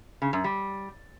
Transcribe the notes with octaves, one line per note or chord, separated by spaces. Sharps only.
C#3
F#2
G3